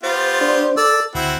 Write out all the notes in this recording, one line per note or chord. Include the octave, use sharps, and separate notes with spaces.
B3 F4 G4 C5 A6
D4 C5
A4 D5 E6
D2 C4 E4 F#4